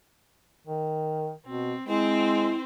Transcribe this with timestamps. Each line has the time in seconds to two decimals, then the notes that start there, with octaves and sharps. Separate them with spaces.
0.67 D#3
1.46 B2 C4
1.88 G#3 C4 E4 C5